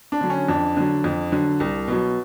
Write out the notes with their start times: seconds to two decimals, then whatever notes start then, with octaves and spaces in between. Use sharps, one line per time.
0.12 D4
0.21 D3 F#3
0.30 C#4
0.49 F2 D4
0.77 D3 F#3
1.04 F2
1.32 D3 F#3
1.60 C2
1.88 B2 F#3